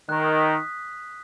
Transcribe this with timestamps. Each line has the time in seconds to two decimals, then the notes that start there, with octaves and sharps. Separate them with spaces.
0.09 D#3 F#6
0.24 D#6
0.40 B6
0.55 D#6